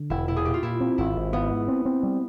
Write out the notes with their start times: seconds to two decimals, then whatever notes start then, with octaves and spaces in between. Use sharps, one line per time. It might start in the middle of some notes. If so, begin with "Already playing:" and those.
Already playing: D3
0.10 E1 E4
0.28 A#2 E4
0.36 G#4
0.45 A#2 G4
0.54 F4
0.63 A#2 E4
0.80 C4
0.98 G#1 E4
1.16 G#1
1.33 G#1 B3
1.51 G#2
1.68 C4
1.85 C4
2.03 G3